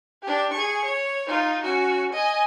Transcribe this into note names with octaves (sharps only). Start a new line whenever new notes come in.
D4 G4
G#4 C#6
C#5
D#4 F4
C#4 F#4
D#5 G#5